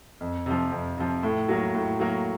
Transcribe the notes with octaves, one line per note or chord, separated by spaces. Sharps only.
F2
C3 F3
F2
C3 F3
A2
F#3 A#3
A2
F#3 A#3